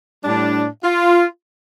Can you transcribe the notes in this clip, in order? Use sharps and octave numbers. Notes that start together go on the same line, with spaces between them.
A2 G3 D4
F4